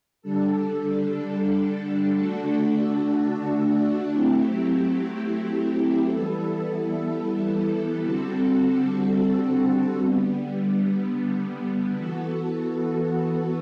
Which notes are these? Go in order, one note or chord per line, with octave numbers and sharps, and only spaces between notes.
D3 G3 D4 A4
D3 A3 D4 F#4 A4
F#3 A3 C4 E4 G4
E3 G3 B3 E4 A4
D3 G3 C4 F#4 A4
D3 G3 B3
E3 B3 F#4 A4